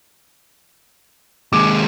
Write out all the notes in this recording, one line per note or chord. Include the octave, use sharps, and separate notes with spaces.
D#2 G#3 D6